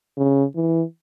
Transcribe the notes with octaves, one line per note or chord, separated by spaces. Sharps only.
C#3
E3